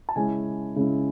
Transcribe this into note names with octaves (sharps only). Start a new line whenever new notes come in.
A5
C#3 G#3 C#4 E4 G#5
C#3 G#3 C#4 E4